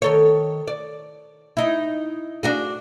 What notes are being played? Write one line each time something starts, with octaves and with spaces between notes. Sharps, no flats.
D#3 A4 C#5
D5
D#4 E4
D4 F#4 G#4